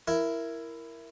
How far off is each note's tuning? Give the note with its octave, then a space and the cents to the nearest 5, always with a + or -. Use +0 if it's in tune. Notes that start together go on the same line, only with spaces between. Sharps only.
E4 +10 A#4 +0